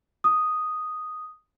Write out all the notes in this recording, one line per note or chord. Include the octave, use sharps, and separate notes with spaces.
D#6